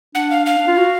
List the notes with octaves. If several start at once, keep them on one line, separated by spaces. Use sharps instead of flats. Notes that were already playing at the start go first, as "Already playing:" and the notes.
D4 F#5
F5
F5
D4
F4
F#4